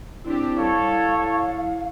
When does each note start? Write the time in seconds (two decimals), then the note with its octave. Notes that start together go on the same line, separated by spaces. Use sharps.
0.25 C4 D4 E4 G4
0.57 G3 A4 C#5 F5